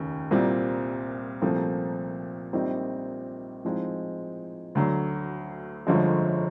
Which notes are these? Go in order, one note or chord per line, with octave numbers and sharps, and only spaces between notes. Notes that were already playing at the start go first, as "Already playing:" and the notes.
Already playing: F1 D#2 C#3
C2 A#2 G3 C4
C2 A#2 F3 A3 C4
A#1 A#2 G3 C4 D#4
A2 F3 G#3 C4 D#4
D2 D3 F#3
G1 F2 D3 F3 G#3